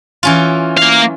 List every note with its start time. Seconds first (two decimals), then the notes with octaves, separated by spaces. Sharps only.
0.23 E3 C#4 F4
0.77 A#3 F5